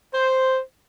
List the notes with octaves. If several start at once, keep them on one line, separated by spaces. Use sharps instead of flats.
C5